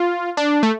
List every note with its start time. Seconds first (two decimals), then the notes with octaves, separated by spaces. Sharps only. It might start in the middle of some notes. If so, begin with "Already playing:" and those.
Already playing: F4
0.37 D4
0.63 A3